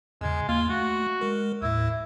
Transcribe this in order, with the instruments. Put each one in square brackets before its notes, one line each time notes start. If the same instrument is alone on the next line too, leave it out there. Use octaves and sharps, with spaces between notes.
[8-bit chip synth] E2 G#2 C#3 [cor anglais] G#3
[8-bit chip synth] D#2 A#3 [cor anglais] F4
[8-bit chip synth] A3 [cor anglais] F#4
[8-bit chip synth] G#3 A#4
[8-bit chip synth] D#2 A2 [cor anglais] E4